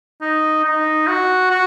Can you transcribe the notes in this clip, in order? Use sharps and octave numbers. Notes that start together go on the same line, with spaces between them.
D#4
D#4
F#4
F#4